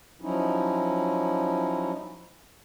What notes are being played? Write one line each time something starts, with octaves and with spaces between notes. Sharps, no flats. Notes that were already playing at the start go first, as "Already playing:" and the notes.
F3 F#3 C#4 D#4 E4